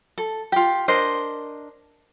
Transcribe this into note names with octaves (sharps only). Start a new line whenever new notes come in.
A4
F4 G4
D4 A#4 C5 D#5